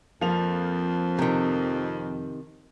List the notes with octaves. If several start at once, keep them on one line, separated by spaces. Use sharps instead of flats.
F2 F3 A#3 F7
C3 D#3